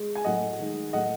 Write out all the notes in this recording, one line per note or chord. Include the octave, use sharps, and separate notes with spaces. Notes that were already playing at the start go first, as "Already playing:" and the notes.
Already playing: G#3
G#5
A2 F#3 A3 D#5 F#5
D#3 G#3
A2 F#3 A3 D#5 F#5